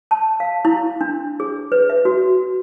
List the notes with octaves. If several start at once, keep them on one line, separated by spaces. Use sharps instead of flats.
A5
F5
E4
D4
G#4
B4
E5
F#4